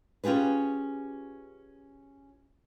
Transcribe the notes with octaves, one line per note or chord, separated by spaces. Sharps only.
C#4 F4 G4 G#4 B4